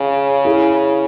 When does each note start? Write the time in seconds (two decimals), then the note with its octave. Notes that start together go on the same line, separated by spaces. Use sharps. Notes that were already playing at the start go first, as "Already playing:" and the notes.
Already playing: C#3 G#4
0.45 E4 G#4